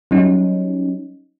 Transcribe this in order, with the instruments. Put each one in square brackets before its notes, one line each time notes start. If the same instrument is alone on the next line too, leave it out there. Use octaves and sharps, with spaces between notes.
[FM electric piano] F#3 G3 C#4 D#4